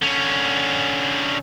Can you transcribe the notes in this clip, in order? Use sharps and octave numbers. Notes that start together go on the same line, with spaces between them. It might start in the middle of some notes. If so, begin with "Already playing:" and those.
D3 C#4